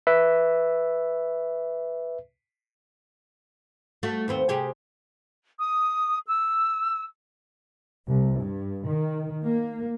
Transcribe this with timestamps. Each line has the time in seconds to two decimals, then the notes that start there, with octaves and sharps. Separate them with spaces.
0.07 B4 E5
4.03 A3 F#4
4.28 D#2 B3 C4
4.49 C3 G4 G#4
5.59 D#6
6.27 E6
8.07 C2
8.40 G2
8.87 D#3
9.44 A#3